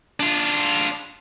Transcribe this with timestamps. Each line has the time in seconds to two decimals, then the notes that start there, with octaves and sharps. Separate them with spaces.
0.20 D4 F4